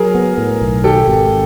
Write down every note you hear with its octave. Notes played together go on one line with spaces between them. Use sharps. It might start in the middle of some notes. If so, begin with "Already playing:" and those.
Already playing: F#3 G#4 A#4
B3
A2
B1
D#3 G4 A4
G#1